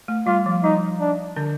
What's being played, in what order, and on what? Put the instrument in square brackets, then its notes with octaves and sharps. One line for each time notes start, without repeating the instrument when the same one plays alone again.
[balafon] A3
[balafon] G3 [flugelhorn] F4
[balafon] F3
[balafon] G3 [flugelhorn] D#4
[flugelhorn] D4
[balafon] D3 D4